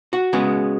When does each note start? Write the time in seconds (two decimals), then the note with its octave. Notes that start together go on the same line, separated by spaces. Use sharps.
0.13 F#4
0.33 C#3 G#3 B3